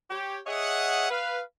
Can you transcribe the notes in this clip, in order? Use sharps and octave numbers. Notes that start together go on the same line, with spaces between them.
G4 C#5
G#4 C#5 D#5 E5 F#5
B4 F5